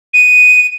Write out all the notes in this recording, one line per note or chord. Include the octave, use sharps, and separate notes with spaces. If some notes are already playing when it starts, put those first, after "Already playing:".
D#7